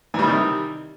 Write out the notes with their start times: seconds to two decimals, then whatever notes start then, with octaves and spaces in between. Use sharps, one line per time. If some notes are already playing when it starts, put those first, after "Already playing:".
0.14 E3
0.19 G3
0.24 D#3
0.29 C3